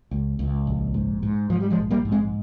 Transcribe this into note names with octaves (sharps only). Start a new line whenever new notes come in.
C#2
C#2
A#1
G#2
G#2
G#2 F3
G3
F3 G#3
A#1
G3 A#3
G#2
G#3 C4